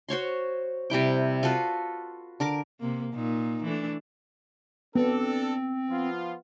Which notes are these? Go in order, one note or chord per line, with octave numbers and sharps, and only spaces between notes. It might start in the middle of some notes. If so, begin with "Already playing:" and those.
F#4 C5 C#5 C6
C3 G3 E4 G5
F4 F#4 A4 B4
D3 A#4 D6
C3 A#3
A#2 D#4
E3 A3 D4
B3 C4 D4 A4
F3 B3 F4